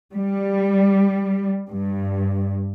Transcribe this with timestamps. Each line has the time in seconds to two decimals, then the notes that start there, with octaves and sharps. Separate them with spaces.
0.14 G3
1.69 G2